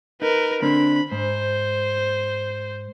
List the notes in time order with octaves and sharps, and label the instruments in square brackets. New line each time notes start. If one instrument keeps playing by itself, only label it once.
[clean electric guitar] D#4 [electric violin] A#4 B4
[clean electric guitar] D3 C4 D4 [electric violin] B5
[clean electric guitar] G#2 [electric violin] C5